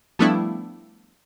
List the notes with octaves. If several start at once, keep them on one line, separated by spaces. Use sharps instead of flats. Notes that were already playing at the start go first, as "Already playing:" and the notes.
F3 G3 A3 B3 D4 E4